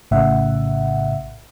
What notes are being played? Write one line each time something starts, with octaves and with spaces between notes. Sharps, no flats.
A#1 A2 C#3 E5 F#5